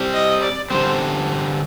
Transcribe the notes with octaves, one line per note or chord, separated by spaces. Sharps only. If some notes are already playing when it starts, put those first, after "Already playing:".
Already playing: G3 C4 G4
D#5
D5
D3 G3 C4 C5